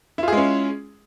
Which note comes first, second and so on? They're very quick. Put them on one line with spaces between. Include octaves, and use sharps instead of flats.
E4 F4 G#4 G#3 C#4